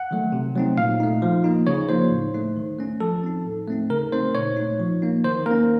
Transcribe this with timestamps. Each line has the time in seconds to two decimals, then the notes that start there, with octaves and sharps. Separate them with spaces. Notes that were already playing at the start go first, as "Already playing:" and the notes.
Already playing: F#5
0.11 D#3 F#3 A3
0.32 C3
0.55 F#3 A3 C4 D#4
0.78 A#2 F5
1.00 A3 D#4
1.22 F3
1.44 A#3 D#4
1.67 C#3 C#5
1.89 F3 A#3 D#4 C5
2.12 A2
2.34 A3 D#4
2.56 D#3
2.79 A3 C#4
3.00 F3 A4
3.23 C4 D#4
3.45 A2
3.68 A3 C4 D#4
3.90 C#3 A#4
4.12 A3 C4 D#4 C5
4.35 A#2 C#5
4.57 A3 D#4
4.80 F3
5.02 A#3 D#4
5.24 D#3 C5
5.46 A#3 A#4
5.51 C#4